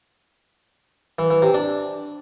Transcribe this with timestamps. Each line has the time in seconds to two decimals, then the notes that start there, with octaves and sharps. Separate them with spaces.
1.19 E3
1.30 E3
1.42 C3
1.54 D4